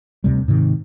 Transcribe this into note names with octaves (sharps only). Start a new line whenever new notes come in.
D2 C3 G3
G#2 C3 D#3